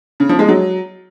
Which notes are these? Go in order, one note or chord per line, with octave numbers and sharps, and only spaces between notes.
C#3
F3
G#3
F#3